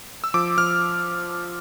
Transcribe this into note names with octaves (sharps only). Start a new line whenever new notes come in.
E6
F3 D6
F3 F6